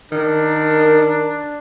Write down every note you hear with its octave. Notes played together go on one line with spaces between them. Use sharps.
D#3 D4 A#4